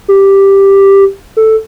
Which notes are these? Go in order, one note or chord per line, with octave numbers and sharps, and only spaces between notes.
G4
A4